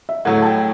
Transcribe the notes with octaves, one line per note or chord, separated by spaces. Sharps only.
E5
A2 F#3 A3 F#5
A5
G5
G5